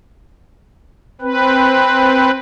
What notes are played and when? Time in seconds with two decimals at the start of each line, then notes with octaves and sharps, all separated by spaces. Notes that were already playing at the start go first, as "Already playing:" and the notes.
1.21 C4 B4